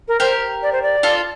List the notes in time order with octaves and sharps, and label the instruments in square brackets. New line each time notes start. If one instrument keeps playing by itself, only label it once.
[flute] A#4
[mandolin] G4 A#4 [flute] C5
[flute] D5
C5
D5
[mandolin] F4 A4